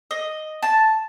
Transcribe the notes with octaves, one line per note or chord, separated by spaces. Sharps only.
D#5
A5